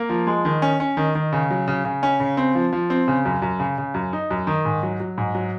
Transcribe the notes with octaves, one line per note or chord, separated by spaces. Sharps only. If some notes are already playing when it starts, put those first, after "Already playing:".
Already playing: A#3
F3
G#3
D#3
C#4
C#4
D#3
D#3
C#3
F#3
C#3
C#3
C#4
C#3
C4
F3
F3
C4
C#3
F#2
F#2
C#3
C#3
F#2
D#4
F#2
D#3
G#2
F#3
F#3
G#2
F#3